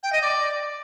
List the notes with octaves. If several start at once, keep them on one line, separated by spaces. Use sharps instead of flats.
G5
D#5
D5